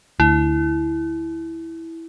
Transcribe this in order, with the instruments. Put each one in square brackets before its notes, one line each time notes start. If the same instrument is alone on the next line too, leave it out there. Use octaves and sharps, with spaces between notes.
[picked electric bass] D2 [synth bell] E4